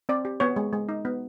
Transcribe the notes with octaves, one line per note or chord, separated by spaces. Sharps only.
C4 D5
G4
B3 C#5
G#3
G#3
D#4
B3